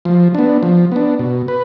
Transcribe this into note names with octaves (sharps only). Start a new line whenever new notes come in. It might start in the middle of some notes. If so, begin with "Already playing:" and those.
F3
B3 D4
F3
B3 D4
B2
B4